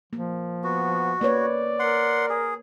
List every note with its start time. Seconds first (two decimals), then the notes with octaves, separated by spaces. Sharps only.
0.13 F3 A#3
0.64 B3 F#4
1.21 A#3 B4 C#5 D5
1.79 A#4 F#5 C6
2.30 G#4